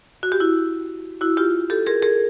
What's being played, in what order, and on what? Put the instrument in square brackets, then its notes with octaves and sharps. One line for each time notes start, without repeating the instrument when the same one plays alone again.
[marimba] F#4
G4
E4 F#4
E4 F#4
F4 G4
G4 A4
G#4 A#4
G#4 A#4